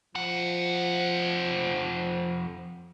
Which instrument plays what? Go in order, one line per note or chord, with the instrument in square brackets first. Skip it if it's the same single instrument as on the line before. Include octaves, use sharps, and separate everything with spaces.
[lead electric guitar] F2 F#5 [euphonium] F3